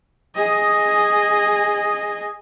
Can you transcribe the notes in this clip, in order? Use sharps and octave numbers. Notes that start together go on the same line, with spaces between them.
G#4 D#5